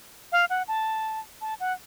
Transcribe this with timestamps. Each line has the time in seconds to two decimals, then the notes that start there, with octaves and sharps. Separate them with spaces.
0.32 F5
0.50 F#5
0.68 A5
1.41 A5
1.60 F#5